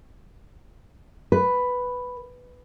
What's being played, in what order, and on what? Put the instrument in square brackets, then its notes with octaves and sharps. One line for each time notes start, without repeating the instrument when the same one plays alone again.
[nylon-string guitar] B4